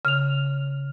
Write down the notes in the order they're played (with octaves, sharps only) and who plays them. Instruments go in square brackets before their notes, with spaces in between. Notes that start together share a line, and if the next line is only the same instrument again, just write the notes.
[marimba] C#3 [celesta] F6 F7